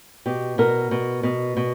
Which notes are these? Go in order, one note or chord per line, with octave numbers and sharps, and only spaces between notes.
B2 G4
B2 A#4
B2
B2
B2